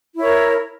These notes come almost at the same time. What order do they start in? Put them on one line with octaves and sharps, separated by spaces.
E4 C#5 A#4